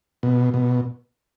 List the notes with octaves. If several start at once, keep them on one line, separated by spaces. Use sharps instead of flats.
B2
B2